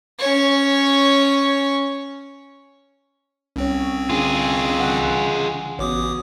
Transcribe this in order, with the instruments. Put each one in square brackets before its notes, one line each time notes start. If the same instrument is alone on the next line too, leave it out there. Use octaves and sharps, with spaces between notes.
[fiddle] C#4 C#5
[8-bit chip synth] C2 C4 [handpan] C#4 C#5
[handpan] D3 D4 [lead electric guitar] F4 G#4
[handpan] C#3 E3 F#5
[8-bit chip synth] A1 D6 D#6 [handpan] B3 F#4 C#5